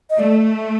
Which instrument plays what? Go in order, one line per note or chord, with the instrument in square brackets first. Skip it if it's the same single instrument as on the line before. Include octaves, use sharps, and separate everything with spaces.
[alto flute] D#5
[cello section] A3 [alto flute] D5